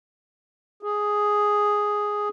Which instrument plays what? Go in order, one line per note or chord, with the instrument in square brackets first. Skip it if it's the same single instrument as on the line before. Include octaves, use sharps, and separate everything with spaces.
[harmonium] G#4